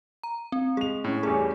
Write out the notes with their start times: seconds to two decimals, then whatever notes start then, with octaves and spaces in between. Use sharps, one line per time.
0.23 A#5
0.52 C4
0.77 G#3 G#4 F7
1.04 A2 C#4
1.23 E2 G3 A3 G#4